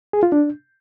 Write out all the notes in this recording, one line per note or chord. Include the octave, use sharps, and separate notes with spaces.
G#4
F4
D4